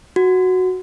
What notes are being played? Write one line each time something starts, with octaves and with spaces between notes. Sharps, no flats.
F#4